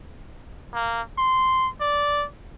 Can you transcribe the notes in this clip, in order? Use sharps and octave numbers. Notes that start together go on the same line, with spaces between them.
A#3
C6
D5